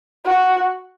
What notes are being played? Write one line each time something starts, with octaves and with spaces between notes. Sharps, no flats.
F#4